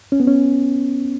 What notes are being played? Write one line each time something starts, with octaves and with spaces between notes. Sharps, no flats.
C#4
B3
C#4